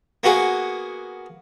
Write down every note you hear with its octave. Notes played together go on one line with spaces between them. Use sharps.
A#3 B3 F#4 G#4